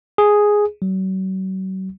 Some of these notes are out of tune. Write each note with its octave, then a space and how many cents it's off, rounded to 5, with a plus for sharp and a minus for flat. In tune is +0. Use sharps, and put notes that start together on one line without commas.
G#4 +0
F#3 +40